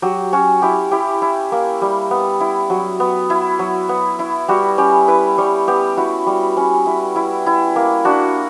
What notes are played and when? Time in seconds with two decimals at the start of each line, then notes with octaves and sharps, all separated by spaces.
0.02 F#3 G4
0.33 C#4 F#4
0.62 E4 G4
0.91 E4 G4
1.22 E4
1.52 A#3
1.82 G3
2.11 B3
2.41 E4
2.70 F#3
3.00 B3
3.30 E4
3.59 F#3
3.89 B3
4.19 E4
4.48 G3 F#4
4.78 C#4 G4
5.08 E4 B4
5.38 G3 C#5
5.68 B3 G4
5.97 E4 F#4
6.27 G3
6.57 C#4
6.86 E4
7.16 E4
7.46 E4
7.76 A#3
8.05 D4 F#4